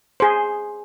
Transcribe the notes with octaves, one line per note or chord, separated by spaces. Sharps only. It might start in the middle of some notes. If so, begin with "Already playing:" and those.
G#4 C5